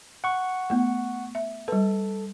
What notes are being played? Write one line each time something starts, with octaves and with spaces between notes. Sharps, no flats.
F#5 C#6
A3 B3
E5
G3 A4 B4